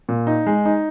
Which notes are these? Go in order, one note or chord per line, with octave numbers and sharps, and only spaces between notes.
A#2
D#4
G#3
D#4